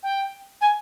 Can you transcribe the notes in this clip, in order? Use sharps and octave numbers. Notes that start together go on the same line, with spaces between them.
G5
G#5